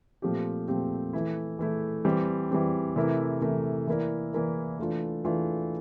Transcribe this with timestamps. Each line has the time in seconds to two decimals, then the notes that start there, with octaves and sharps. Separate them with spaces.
0.22 A#2 F3 A3 C4 G4
0.68 A#2 F3 A3 C4 G4
1.13 E3 A3 E4
1.59 E3 A3 E4
2.05 E3 G3 C4
2.51 E3 G3 C4
2.96 C3 E3 A3 E4 A#4
3.41 C3 E3 A3 E4 A#4
3.87 E3 A#3 E4 A#4 D5
4.33 E3 A#3 E4 A#4 D5
4.79 E3 A3 D4 F4
5.24 E3 A3 D4 F4